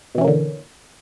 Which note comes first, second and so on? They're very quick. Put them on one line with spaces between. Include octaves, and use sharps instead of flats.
B2 E3 C#4 A#3 D3